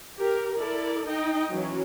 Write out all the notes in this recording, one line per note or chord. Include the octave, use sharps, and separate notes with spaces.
G4 A#4
E4 A4 A#4 D5
D#4 D#5 G5
E3 F#3 C#4